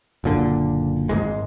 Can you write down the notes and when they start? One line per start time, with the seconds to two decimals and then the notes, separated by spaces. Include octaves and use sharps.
0.24 F#1 A#2 D3
1.09 G#1 G#2 G#3